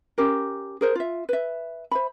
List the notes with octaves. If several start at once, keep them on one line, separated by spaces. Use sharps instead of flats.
C#4 G4 A#4
G#4 A#4 C5
F4 E5
B4 E5
C5 E5 B5